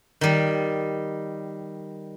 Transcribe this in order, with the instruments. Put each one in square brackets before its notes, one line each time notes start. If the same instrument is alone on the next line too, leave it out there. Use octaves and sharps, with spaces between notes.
[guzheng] D#3 G3